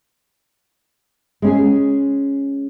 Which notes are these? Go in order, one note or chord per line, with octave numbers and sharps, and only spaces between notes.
G#3 C#4 G#4